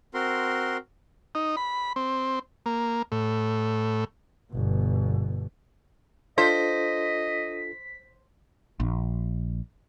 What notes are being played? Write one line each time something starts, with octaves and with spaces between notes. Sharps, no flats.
C4 F#4 A#4 C6
D#4
B5
C4
A#3
A2
G1 B2
D4 F4 A4 C5 D#5 B6
A#1